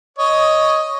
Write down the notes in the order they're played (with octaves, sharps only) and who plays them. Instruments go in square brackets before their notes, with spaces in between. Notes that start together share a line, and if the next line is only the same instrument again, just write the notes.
[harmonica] C#5 D#5